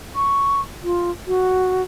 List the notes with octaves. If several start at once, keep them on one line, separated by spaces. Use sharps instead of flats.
C#6
F4
F#4